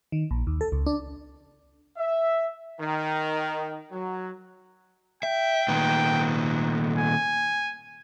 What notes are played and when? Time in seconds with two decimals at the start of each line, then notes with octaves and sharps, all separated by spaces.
0.12 D#3
0.31 A#1
0.47 D#2
0.61 A4
0.72 C#2
0.86 D4
1.97 E5
2.81 D#3
3.91 F#3
5.23 E5 G5
5.68 A#2 D#3 B3
6.98 G#5